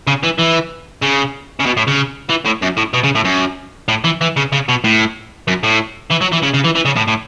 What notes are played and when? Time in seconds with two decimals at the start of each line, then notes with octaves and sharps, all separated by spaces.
0.07 C#3
0.24 E3
0.39 E3
1.02 C#3
1.60 C#3
1.66 B2
1.77 A2
1.88 C#3
2.29 E3
2.45 A2
2.62 F#2
2.77 A2
2.94 B2
3.04 C#3
3.15 A2
3.25 F#2
3.89 A2
4.04 E3
4.21 E3
4.37 C#3
4.53 C#3
4.69 B2
4.84 A2
5.48 F#2
5.64 A2
6.11 E3
6.22 F#3
6.33 E3
6.43 C#3
6.54 C#3
6.65 E3
6.76 E3
6.85 C#3
6.97 A2
7.08 A2